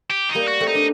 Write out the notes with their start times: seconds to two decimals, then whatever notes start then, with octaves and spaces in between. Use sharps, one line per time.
0.10 G4
0.29 D#4
0.35 G3 A#3
0.48 F#4
0.60 A3 C4
0.67 D#4
0.75 D4